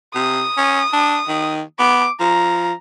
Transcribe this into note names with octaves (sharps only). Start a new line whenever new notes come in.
C3 D#6
C#4
D4
D#3
B3 D6
F3 A#5